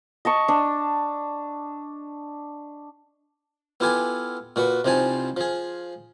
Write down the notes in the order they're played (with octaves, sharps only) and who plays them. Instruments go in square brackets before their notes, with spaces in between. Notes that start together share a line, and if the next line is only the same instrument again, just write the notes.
[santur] D#5 A5 C#6
D4
[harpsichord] B3 E4 F4 G4 A4 G#5
A#2 F#4 B4 C#6
C2 F3 C4 D#4 G#5 A5
F3 G#4